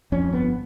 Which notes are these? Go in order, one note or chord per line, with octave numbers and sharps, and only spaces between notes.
F2 C#4
G1 B3